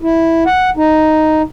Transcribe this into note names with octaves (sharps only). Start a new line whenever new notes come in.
E4
F#5
D#4